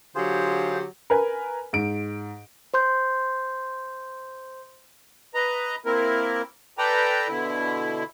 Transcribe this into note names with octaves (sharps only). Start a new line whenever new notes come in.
D3 F#3 F4 G4 G#4 C5
A#4 B4 G#5
G#2 D7
C5 C6 G6
B4 D#5 A#5
A#3 C4 E4 A#4
A4 B4 D5 G5 A#5
B2 D3 E4